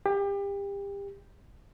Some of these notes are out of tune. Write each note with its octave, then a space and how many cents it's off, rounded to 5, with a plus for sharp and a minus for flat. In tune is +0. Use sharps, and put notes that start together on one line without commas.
G4 +30